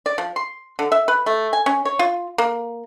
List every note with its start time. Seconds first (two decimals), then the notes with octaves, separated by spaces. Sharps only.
0.06 D5
0.18 F3
0.36 C6
0.79 D3
0.92 E5
1.08 B4
1.26 A3
1.53 G#5
1.66 C#4
1.85 C#5
1.99 F4
2.38 A#3